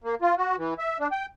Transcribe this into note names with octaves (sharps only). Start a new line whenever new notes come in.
A#3
F4
F#4
E3
E5
D4
G5